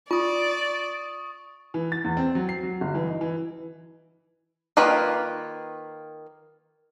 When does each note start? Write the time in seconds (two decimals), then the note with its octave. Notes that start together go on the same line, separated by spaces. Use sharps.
0.11 F4 D5 C#6 D#6
1.74 E3
1.92 A6
2.04 E2
2.17 C4
2.35 F#3
2.49 C7
2.63 F#3
2.81 G1
2.95 E3
3.08 D#4
3.21 E3
4.77 D#3 A#3 F4 B4